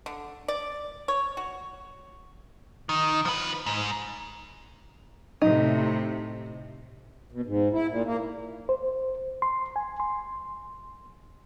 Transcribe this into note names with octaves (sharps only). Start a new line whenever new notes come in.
D3
D5
C#5
F#4
D#3
F3 B4
G#2
A2 C3 D#4
B2
G#2
E4
A#2
A#3
C5
C6
G#5
C6